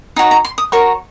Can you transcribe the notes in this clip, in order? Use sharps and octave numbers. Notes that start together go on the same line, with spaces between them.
D#4 F#4 C#5 G#5
A#5
C6
D#6
F#4 A#4 C#5 C#6